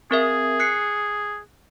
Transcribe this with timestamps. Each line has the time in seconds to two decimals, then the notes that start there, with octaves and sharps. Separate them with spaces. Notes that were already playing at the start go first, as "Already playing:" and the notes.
0.11 C4 G#4 A#4 E5
0.60 F#6 C7 C#7